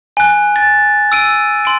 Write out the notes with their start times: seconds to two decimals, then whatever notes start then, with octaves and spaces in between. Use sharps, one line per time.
0.17 G#5 F#6
0.56 A6
1.12 E6 D7 D#7
1.65 C6 D7